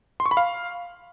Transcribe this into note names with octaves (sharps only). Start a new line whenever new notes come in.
C6
C#6
B5
F5